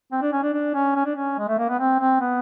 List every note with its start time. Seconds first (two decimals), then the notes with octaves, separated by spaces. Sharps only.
0.12 C4
0.22 D4
0.32 C#4
0.43 D4
0.54 D4
0.74 C#4
0.95 C#4
1.05 D4
1.15 C#4
1.38 G#3
1.49 A3
1.58 A#3
1.69 B3
1.79 C4
2.00 C4
2.21 B3